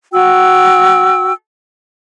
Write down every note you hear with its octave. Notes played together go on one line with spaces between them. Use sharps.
F#4 G5 E6